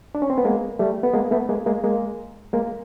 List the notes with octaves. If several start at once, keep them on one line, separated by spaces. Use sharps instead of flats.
D4
C#4
C4
B3
G#3 A#3
G3 A3
B3
G#3 A#3
A3 B3
G#3 A#3
G#3 A#3
G#3 A#3
G#3 A#3